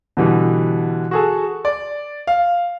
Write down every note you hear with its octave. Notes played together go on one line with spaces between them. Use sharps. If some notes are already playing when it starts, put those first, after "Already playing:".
B2 D3 E3 G3
F#4 G#4 A4
D5
F5